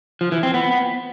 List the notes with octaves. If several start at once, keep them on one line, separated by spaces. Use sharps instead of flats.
F3
E3
C4
B3